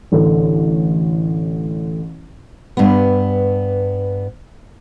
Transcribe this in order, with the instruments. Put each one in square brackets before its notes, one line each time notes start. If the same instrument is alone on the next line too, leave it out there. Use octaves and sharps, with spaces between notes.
[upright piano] A1 D3
[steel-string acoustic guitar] G2 B3